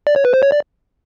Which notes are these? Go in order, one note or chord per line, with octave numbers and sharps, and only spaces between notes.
D5
C#5
B4
C5
C#5
D5